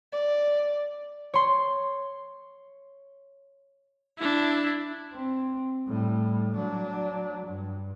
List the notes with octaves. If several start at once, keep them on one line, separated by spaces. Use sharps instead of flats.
D5
C#5 C6
D4 E4
C4
A2 G3
F#3 D4
G2